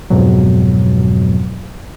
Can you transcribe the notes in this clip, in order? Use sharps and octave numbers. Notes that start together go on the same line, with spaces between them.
F2 G#2 B2 F#3